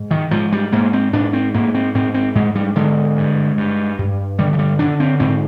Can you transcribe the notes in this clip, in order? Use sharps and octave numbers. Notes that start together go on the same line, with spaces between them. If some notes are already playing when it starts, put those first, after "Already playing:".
Already playing: G#2
D#3
G#2 F3
G3
G#2 A#3
C4
G#2 D4
C4
G#2 A#3
C4
G#2 C4
C4
G#2 G#3
G3
D3 G#3
G2
G2
G2
D3 G3
F3
G3
D3 D4
C4
G#2 C4